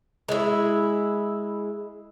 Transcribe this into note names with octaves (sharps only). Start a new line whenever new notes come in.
G#3 E4